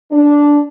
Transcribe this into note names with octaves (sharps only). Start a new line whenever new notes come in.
D4